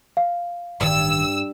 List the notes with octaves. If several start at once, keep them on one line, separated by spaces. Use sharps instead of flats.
F5
A1 G2 D#3 E6